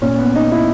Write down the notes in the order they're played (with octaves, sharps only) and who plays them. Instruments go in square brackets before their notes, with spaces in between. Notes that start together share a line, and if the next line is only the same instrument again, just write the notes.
[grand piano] A#2 C#4
B3
D#4
E4